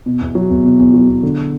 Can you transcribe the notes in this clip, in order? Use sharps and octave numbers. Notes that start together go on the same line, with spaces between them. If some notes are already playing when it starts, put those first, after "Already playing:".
B2
E2
F#3
E2
B2
E2
F#3
E2
D3